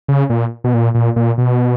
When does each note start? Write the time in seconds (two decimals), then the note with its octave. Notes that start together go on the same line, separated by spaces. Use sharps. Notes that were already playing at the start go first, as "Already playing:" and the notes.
0.08 C#3
0.30 A#2
0.64 B2
0.74 A#2
0.95 A#2
1.16 A#2
1.38 B2